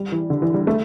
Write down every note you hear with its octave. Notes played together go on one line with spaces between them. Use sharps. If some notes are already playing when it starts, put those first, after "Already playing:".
Already playing: G3
E3
D3
E3
G3
A3